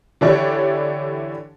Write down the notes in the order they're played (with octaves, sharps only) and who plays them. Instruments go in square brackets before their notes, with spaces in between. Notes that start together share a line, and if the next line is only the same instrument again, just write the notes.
[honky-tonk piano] D3 E3 D4 E4 G4 C#5